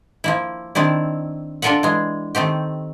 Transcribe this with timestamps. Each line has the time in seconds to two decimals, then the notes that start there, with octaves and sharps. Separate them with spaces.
0.24 F3 A#3 E4
0.75 D#3 C4 D4 E4
1.62 D4 F4 A4 A#4 E5 F#5
1.83 E3 G#3
2.35 D#3 A3 C4 G4